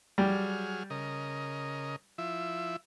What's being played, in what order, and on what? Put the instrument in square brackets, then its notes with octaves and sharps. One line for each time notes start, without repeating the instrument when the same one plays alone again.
[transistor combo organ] F#3 G#4 F6 [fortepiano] G3
[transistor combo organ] C#3 A#4 D#5
F3 E4 E5